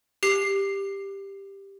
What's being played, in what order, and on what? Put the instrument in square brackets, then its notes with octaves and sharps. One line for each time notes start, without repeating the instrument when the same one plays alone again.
[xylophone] G4 C7